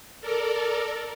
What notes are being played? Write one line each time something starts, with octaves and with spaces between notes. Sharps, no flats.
A4 A#4 D5